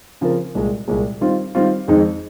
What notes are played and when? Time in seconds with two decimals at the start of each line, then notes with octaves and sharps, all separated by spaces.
0.21 C#3 F3 C4 F4 A#4
0.55 C2 A#2 G#3
0.88 C2 A#2 G#3
1.21 D#3 G3 C4 F4
1.55 D#3 G3 C4 F4
1.88 F2 D#3 G#3 C4 D#4